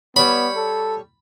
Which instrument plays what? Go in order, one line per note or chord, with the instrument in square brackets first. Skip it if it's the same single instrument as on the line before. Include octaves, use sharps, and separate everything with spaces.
[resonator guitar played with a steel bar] G3 C#5 [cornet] B3 [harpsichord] B5
[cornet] A4